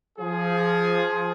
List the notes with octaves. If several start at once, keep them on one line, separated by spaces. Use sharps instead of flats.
F3 G#4